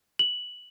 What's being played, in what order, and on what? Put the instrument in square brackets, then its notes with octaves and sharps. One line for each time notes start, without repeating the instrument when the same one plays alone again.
[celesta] F#7